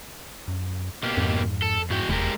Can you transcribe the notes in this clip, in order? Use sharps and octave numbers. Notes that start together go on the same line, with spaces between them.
F#2
B2 A#3 G4
F2 G#2
A4
E2 G#2 F#4 G5
F1 E2 G#3 G4 A#4